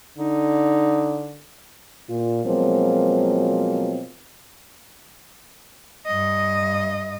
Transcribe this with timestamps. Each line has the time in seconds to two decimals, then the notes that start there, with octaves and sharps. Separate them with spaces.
0.18 D3 D#4
2.09 A#2 F4
2.45 B2 F3 F#3 G#3 A#3 C4
6.06 G2 D#5